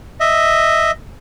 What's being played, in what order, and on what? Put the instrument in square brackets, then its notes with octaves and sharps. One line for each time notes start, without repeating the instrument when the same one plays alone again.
[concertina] D#5 E5